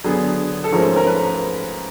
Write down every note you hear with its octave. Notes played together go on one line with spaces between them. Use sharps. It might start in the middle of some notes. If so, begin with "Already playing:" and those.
D3 F#3 B3 G#4
A4
G#2 F3 A3 C#4 A#4
A#4
B4